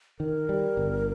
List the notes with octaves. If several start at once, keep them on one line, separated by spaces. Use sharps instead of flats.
D#3 A#4
G3
G1